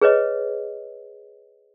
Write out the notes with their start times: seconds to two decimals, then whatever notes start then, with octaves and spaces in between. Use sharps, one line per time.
0.01 G#4 B4 C#5 D#5